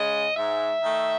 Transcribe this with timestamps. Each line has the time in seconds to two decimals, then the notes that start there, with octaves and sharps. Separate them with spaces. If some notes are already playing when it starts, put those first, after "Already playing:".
Already playing: C#3 G#3 D#5
0.36 G#2 E5
0.82 D#3 A3